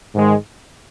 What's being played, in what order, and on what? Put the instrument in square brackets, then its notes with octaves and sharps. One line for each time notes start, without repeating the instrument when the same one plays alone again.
[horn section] G#2 D#3 G#3